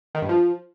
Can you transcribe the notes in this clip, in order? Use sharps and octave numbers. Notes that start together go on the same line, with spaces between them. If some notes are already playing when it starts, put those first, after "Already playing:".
D#3
G2
F3